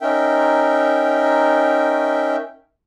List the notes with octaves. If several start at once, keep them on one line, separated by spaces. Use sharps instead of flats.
C#4 D#4 A#4 E5 G5